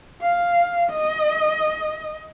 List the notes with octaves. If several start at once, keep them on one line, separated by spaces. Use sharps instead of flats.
F5
D#5